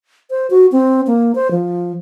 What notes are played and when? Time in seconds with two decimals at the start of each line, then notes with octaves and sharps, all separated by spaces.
0.31 C5
0.50 F#4
0.72 C4
1.07 A#3
1.35 C5
1.51 F3